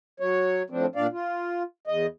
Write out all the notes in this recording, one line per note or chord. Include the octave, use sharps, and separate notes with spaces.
F#3 C#5
A2 F3 C4 D4
A#2 D4 D5 F5
F4
E2 D#5